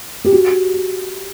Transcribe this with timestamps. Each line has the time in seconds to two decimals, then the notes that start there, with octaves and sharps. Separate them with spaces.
0.25 G4
0.33 F#4